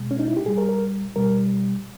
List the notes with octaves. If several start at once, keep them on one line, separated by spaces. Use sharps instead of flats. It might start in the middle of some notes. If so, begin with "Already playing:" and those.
Already playing: B2 G#3
C#4
D#4
E4
G4
A#2 G3 G#4
A#4
A#4
B2 G3 A#4